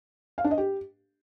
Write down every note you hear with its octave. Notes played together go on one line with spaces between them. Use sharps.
F5
D4
D#5
G4